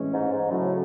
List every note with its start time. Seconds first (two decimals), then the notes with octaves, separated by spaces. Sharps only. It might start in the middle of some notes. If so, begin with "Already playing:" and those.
Already playing: A2 E3 G#3 C#4
0.13 G#2
0.32 G#2
0.50 A2 C#3 F#3 C#4